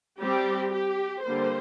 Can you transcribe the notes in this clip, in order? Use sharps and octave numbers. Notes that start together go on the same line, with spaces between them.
G3 C4 G4
G4
D3 G3 A#3 C5